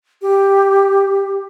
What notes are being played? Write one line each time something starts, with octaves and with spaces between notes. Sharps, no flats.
G4